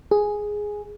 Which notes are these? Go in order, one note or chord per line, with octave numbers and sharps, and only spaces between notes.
G#4